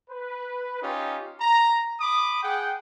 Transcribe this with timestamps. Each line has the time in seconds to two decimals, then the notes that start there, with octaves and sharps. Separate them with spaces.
0.10 B4
0.82 C#4 D#4 F4 G4
1.41 A#5
2.01 B5 D6 D#6
2.42 G#4 F#5 G5